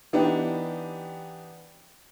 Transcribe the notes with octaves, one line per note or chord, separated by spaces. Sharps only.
E3 B3 D4 D#4 G4